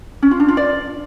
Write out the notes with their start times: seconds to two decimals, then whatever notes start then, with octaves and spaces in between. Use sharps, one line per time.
0.23 C#4
0.31 F4
0.40 D4
0.48 F4
0.57 D5